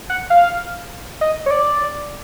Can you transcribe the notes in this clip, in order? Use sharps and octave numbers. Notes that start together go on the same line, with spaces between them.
F#5
F5
D#5
C#5
D5